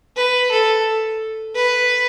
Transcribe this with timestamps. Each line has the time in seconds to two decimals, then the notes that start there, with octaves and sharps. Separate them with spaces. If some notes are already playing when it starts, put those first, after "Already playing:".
0.17 B4
0.51 A4
1.56 B4